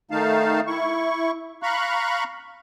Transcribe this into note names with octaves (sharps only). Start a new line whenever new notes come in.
D#3 A3 D#4 F5 A5
E4 C#6
F5 A#5 B5 C#6 F#6